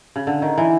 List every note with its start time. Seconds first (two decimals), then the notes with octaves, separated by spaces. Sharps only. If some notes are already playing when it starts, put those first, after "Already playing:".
0.16 C#3
0.27 D3
0.42 D#3
0.58 E3